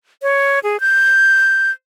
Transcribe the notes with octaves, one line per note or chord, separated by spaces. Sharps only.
C#5
G#4
G6